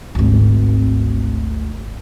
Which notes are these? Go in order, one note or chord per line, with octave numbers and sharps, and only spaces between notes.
G#1 D2